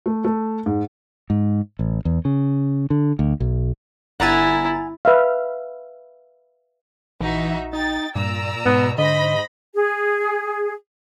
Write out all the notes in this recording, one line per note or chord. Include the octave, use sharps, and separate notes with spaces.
A3
A3
G#2
G#2
A1
E2
C#3
D3
D2
B1
G1 E4 F#5 G#5 A#5 A6
B4 E5 F5
A#1 E3 D#4 F#4 E5
D#4 G5 A6
G2 A#2 D5 A#5 E6
G#2 B2 B3
G#2 D3 C5 D#5 B5 A#6
G#4